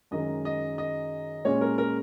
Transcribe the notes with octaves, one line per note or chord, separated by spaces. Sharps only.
F#2 D#3 G#3 D#5
D#5
D#5
A#2 G#3 C#4 C#5
A#4
A#4